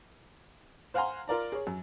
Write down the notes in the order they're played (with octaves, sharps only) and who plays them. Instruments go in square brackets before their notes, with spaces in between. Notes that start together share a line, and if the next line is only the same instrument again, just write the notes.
[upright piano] C5 F5 F#5 G#5 A#5 C6
F4 A#4 D5 A#5
G#4 C#5
F#2